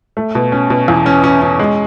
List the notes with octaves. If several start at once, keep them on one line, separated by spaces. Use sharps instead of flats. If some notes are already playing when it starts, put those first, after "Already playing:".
A3
B2
C#4
B2
E2
C#4
C#4
C#4
G#3